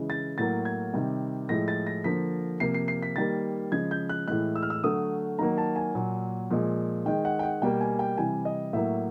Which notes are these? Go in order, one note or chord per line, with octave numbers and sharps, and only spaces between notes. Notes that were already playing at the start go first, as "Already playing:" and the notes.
Already playing: C#3 E3 G#3
A6
A2 F#3 A#3 A6
G#6
C3 D#3 G3
A2 F3 G#3 A#6
A6
A#6
D3 F3 A#3 B6
C3 F3 A#3 C7
C7
C7
B6
D#3 G3 A#3 A6
C#3 F3 G#3 G#6
G6
F#6
A2 E3 G#3 F#6
E6
F6
E6
D3 F#3 A3 D#6
D#3 F#3 A#3 A#5
A5
G#5
A#2 F#3 A#3
A#2 F3 G#3
D#3 G#3 G5
F#5
G5
F#5
B2 G3 A#3 G5
G#5
G5
C3 E3 G3 G#5
D#5
A2 F#3 A#3 E5